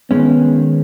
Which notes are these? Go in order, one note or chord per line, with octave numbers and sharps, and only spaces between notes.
D#3 G#3 B3 C#4